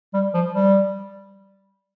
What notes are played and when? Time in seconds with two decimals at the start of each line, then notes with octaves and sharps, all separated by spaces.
0.13 G3
0.34 F3
0.54 G3